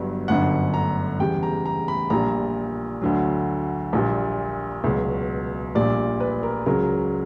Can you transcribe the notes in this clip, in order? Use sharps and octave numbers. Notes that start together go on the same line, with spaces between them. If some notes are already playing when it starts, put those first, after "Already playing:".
Already playing: G1 G2 F#3
G1 F#2 D3 F#5
A#5
E2 C#3 G3 G5
A#5
A#5
B5
A#1 A#2 G3 A#5
D2 D3 F#3
A#1 A#2 G3
C#2 B2 F#3
A#1 A#2 G3 D5
B4
A#4
C#2 C#3 F#3 A#4